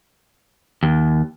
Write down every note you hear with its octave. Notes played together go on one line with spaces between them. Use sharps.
D#2